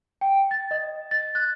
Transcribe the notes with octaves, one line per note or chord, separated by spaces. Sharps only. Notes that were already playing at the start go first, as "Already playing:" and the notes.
G5
A6
D#5
A6
F#6